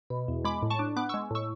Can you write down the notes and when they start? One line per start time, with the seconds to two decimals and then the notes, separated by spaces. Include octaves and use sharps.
0.10 B2
0.28 E2
0.45 G#3 B5 D6
0.62 A2
0.70 A5 C#6
0.79 D4
0.96 B3 D6 F#6
1.09 C#6 E6
1.14 G#3
1.31 A2 C#6 E6